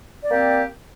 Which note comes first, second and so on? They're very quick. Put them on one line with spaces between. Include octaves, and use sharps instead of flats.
D5 C4 A#3 G4